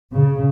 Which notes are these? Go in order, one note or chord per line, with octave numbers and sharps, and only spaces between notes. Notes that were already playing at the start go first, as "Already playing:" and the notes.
C#3